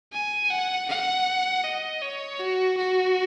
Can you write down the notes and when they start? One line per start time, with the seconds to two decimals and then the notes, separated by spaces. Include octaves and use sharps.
0.13 G#5
0.51 F#5
0.89 F#5
1.64 D#5
2.02 C#5
2.40 F#4
2.78 F#4